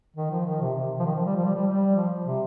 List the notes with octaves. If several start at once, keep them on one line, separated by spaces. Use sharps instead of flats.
D#3
F3
D#3
C3
C3
F3
D#3
F3
G3
F3
G3
G3
G3
F3
C3